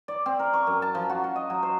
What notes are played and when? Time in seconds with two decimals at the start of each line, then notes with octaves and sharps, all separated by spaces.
0.08 D5
0.26 C4
0.39 A#4
0.54 C#6
0.67 F#2
0.82 A5
0.95 F3
1.09 F#4
1.24 F#4
1.36 D#5
1.50 F#3
1.63 C5